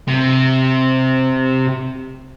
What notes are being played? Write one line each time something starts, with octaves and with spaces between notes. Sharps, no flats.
C3